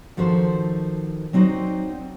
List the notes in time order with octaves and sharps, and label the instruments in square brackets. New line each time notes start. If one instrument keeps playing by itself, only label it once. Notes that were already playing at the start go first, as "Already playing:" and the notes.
[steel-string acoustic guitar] D#3 F3 D#4 F#4 A4 C5
F#3 C4 D#4 F#4 C5 D5